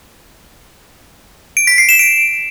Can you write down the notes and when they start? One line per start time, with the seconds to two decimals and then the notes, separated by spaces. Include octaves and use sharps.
1.57 D7
1.67 B6
1.78 C7
1.89 E7
1.99 D7